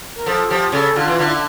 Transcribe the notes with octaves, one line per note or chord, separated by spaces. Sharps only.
A#4
F3 A4
F3 G4
C#3 A4
D3 F4
E3
D3 F4
E4